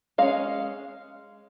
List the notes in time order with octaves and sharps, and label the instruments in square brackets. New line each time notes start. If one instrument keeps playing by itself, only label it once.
[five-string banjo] G#3 C#4 F5